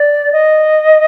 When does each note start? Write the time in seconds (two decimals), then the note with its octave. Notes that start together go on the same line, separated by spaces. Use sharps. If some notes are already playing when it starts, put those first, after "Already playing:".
Already playing: D5
0.32 D#5